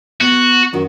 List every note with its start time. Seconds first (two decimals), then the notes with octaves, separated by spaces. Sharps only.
0.21 B3 F#4
0.73 F#2 D#3 F#4